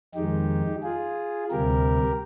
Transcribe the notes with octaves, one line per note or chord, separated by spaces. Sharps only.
F2 D#3 G#3 D#4 G4
F4 G#4
D2 C3 G3 G4 A#4